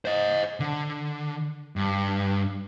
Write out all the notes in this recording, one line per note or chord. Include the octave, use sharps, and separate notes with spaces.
C5 D#5
D3
G2